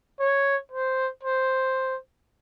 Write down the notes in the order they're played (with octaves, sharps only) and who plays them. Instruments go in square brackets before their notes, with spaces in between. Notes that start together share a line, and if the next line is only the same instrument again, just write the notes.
[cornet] C#5
C5
C5